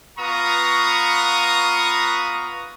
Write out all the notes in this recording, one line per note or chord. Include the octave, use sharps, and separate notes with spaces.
B3 F4 B4 A#5 C#6 D#6